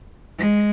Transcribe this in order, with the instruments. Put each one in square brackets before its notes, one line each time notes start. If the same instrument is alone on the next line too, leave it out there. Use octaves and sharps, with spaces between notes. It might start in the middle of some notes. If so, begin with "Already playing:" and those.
[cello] G#3